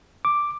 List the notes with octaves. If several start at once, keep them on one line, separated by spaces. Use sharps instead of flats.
D6